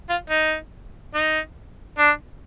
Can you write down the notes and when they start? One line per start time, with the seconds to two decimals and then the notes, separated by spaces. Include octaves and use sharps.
0.09 F4
0.30 D#4
1.14 D#4
1.98 D4